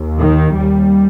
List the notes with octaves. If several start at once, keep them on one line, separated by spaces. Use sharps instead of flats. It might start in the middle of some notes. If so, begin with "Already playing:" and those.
Already playing: D#2
D#3
D#2 G3